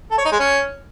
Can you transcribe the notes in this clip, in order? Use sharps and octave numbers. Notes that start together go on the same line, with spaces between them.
A4
C#5
D#4
G#3
C#4